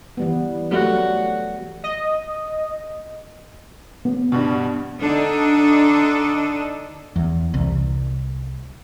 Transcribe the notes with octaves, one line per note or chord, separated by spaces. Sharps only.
E3 G3 B3
F#3 G3 A3 F#4
D#5
B3
G2 B2
D3 D4 D#4 A4 D#5
E2
C2